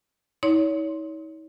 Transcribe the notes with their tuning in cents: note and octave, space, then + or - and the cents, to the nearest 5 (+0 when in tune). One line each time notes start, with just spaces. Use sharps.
D#4 +45 C#5 +30 C6 +10